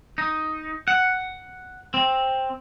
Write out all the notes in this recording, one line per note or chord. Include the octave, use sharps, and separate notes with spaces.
D#4
F#5
C4